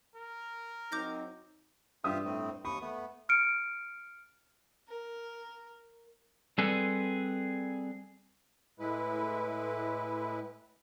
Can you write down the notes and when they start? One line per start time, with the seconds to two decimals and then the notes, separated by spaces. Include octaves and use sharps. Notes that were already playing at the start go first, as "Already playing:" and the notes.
0.15 A#4
0.92 F#3 C4 D#4 D6 G6 A#6
2.04 G2 F4 G4 E5 D#6
2.25 A2 A3 C4
2.65 D#2 B5 C#6 D#6
2.81 A3 B3
3.29 F6 C#7 D7
4.89 A#4
6.58 G3 C4 G#4 A4 B4
8.79 A2 G#3 E4 B4